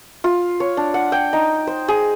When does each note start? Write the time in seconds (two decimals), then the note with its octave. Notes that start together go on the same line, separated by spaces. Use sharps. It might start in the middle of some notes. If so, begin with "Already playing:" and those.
0.24 F4
0.60 C#5
0.77 D4
0.94 F#5
1.12 G5
1.33 D#4
1.67 C5
1.88 G#4